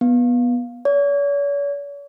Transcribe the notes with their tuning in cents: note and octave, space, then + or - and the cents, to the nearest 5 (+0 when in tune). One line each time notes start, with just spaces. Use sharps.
B3 -15
C#5 +45